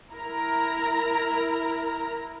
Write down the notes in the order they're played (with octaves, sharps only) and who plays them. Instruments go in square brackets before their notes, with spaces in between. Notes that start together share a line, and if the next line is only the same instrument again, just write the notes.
[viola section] E4 A#4 A#5